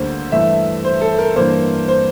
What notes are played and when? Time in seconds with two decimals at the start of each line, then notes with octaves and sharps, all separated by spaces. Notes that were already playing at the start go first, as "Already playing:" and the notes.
Already playing: D2 D3 G3 A#3 C5
0.32 G2 E3 A3 E5
0.84 C5
1.01 A4
1.19 A#4
1.36 G2 E3 A#3 C5
1.88 C5